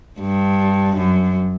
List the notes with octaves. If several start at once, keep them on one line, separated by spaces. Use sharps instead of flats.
G2
F#2